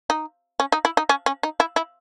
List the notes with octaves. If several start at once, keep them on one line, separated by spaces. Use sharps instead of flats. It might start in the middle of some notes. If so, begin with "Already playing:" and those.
D#4
C#4
D#4
E4
D#4
C#4
C#4
D#4
E4
E4